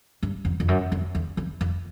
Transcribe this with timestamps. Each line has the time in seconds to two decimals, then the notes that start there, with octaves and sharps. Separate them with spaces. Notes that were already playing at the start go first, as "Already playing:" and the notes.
0.23 G2
0.45 F2
0.60 F2
0.68 F#2
0.92 F2
1.15 E2
1.37 F2
1.61 F2